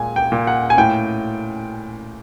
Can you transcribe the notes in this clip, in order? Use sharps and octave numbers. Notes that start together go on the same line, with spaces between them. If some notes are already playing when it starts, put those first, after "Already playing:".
Already playing: A#2 G#3 G#5
G5
A#2
F#5
G#5
A2 G5